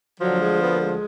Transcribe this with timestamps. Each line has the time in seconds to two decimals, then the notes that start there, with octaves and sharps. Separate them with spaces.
0.20 D2 D3 F3 F#3
0.40 G#3
0.60 B3
0.73 A#3
0.80 G#3